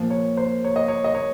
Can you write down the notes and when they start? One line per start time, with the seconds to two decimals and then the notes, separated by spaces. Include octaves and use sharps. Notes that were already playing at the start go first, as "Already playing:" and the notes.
Already playing: A#2 F3
0.10 C#5
0.37 C5
0.64 C#5
0.76 D#5
0.88 C#5
1.04 D#5
1.15 C#5